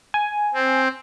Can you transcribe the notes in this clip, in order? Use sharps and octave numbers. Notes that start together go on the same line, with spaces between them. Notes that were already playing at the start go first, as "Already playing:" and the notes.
G#5
C4